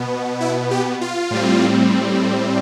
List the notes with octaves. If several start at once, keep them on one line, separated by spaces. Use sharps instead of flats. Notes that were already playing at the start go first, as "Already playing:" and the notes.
Already playing: B2 B3
E4
G4
F4
A2 G3 C4